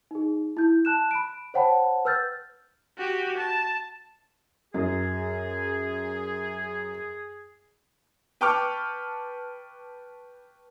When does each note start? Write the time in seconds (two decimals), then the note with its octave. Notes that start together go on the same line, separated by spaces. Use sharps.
0.11 D#4 G#4
0.57 E4 G6
0.85 A5 F#6 E7
1.11 B5 D7
1.54 C5 C#5 F#5 G5 A5 B5
2.05 B4 E6 F6 G6 A6
2.98 F#4 G4
3.37 A5
4.74 F#2 G#4
8.41 B4 G5 A5 C#6 D6 F6